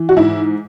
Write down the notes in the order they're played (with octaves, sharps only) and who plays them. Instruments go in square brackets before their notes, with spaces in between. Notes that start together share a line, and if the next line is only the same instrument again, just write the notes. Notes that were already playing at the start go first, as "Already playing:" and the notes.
Already playing: [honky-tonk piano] E3
F#4
G#2 E4